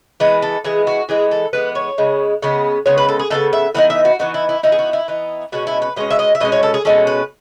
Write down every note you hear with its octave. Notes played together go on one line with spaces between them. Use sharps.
E3 G#3 B3 B4
A4
E3 G#3 B3 G#4
F#4
E3 G#3 B3 G#4
A4
E3 G#3 B3 B4
C#5
C#3 G#3 B3
C#3 G#3 B3
C#3 G#3 B3 C#5
B4
A4
G#4
C#3 G#3 B3 A4
E5
E3 B3 D#4 F#5
E5
F#4
E3 B3 D#4 F#4
E4
E4
E3 B3 D#4 E4
G#4
F#4
E4
E3 B3 D#4
B2 G#3 C#4 F#4
E4
B4
B2 G#3 C#4 D#5
E5
D#5
E5
B2 G#3 C#4 D#5
C#5
A4
G#4
B2 G#3 C#4 A4
B4